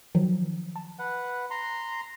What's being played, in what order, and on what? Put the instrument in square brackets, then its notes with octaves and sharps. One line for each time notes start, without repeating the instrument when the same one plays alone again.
[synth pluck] D#3 F3 F#3
A5
[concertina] B4 F#5
A#5 C6